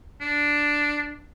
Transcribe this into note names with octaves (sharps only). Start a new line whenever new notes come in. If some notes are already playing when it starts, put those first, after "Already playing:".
D4